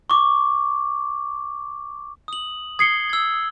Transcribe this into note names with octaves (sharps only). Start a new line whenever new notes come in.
C#6 D6
D#6 F#7
D#6 G#6 C7 C#7 G7
E6 G#6